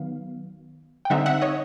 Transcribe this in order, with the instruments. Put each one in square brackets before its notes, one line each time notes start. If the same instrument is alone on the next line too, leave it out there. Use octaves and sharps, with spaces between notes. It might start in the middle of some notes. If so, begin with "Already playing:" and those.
Already playing: [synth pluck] D#3 F#3 B3 F5
G5
D3 G3 C4 D#4 E5 F#5
E5 F#5
C#5 D#5